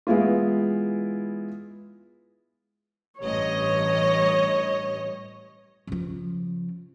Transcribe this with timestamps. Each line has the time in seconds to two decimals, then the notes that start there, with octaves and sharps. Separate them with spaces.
0.07 E3 G#3 B3 E4 F4
3.21 A1 G2 C#5 D#5
5.87 C#3 F3